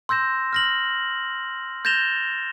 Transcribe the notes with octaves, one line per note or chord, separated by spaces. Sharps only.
C6 E6 G6 A#6 E7
F6 A#6 F#7
G6 A6 A#6 E7 F7 G7